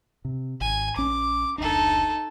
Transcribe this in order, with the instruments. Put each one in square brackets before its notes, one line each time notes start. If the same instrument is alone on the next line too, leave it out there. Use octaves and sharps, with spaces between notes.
[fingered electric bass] C3
[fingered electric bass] G#1 [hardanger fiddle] G#5
[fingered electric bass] A#1 C#4 [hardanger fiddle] D6
[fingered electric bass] F1 C#2 D4 [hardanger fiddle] D#4 A4